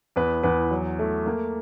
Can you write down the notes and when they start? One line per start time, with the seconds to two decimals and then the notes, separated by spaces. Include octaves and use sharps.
0.16 E2 B4
0.43 E2 B4
0.71 F#3
0.99 A3
1.26 A#3